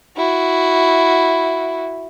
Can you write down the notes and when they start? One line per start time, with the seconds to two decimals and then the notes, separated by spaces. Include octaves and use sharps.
0.17 E4 F#4